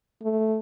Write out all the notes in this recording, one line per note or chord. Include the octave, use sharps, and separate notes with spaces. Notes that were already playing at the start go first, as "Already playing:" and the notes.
A3